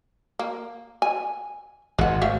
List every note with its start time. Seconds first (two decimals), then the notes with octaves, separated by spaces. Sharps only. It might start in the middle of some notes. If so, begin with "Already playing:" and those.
0.39 A#3
1.02 G#5
1.99 G#1 G#3 F#5
2.22 A3 E5 F5